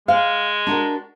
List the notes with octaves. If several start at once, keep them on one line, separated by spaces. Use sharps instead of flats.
G#3 F5
D4 F#4 A#4